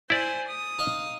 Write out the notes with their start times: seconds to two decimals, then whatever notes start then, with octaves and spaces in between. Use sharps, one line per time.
0.10 E4 C5 D5 G#5
0.48 D#6
0.79 D#4 D#5 F5